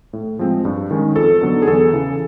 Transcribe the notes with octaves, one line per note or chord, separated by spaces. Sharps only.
A2
F3 G#3 C4
G2
D#3 G#3 C#4
F2 A4
D3 F#3 B3 D#4
G#4
E2 A4
C#3 E3